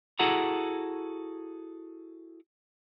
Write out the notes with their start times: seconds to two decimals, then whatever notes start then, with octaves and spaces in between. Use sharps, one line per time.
0.19 E4 F#4 G#4 A4 F#5 A#5